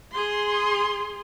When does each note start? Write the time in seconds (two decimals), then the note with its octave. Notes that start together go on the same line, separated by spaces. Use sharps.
0.12 G#4 C6